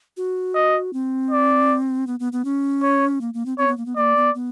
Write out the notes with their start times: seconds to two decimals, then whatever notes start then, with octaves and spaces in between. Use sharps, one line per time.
0.17 F#4
0.55 D#5
0.93 C4
1.31 D5
2.07 B3
2.20 B3
2.32 B3
2.45 C#4
2.83 C#5
3.21 A#3
3.34 A#3
3.46 C4
3.58 C4 C#5
3.67 B3
3.77 A#3
3.86 B3
3.96 A#3 D5
4.16 B3
4.34 B3